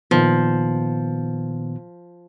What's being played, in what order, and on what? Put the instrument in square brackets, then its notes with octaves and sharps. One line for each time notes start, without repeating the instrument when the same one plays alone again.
[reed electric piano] A#2 D#3 B3 [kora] F3